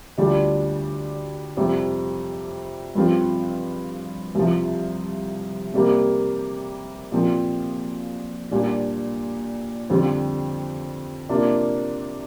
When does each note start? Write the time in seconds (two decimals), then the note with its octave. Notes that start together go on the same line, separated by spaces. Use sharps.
0.18 D2 D3 G3 D4 F4
1.57 F2 C3 G3
2.95 G2 F3 C4 F4
4.35 C2 C3 F3
5.74 C3 G3 A#3
7.12 A#2 F3 C4 F4
8.51 A#2 G3 D4 F4
9.90 F2 D3 G3 C4 F4
11.29 C3 A#3 D4 F4